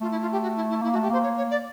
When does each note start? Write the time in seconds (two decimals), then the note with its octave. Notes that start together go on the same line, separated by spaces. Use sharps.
0.01 A3 F4
0.11 E4
0.21 F4
0.32 G4
0.42 F#4
0.56 E4
0.69 E4
0.82 A#3 E4
0.92 F#4
0.96 A3
1.02 G4
1.10 A#3 C5
1.23 C#5
1.37 C#5
1.50 D5